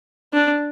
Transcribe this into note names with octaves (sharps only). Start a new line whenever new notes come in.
D4